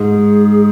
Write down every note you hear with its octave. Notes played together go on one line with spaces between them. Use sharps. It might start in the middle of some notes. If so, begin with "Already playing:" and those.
Already playing: G#2 G#4